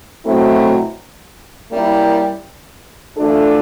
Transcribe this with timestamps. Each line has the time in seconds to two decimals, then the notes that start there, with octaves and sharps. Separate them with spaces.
0.24 B2 F#3 A3 C4 E4
1.70 G3 A#3 C#4 E4
3.17 E3 A3 D4 F4 A4